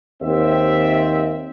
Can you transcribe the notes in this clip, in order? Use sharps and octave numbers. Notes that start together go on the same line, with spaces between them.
D#2 C4 E5